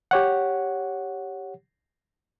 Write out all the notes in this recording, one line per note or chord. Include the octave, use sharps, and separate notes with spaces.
G4 C#5 F#5